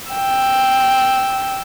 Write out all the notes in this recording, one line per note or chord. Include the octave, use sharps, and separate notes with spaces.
G5 E6